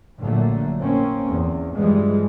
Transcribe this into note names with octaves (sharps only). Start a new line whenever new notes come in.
A#1 D3 F#3 A3 A#3
A#3 C4 C#4
E2
G2 E3 F3 G3 G#3